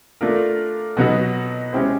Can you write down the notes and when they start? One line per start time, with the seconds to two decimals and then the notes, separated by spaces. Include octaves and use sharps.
0.21 A3 D4 F4 A#4
0.97 B2 F#3 B3 D#4 F#4
1.73 G#3 C#4 E4 G4 C5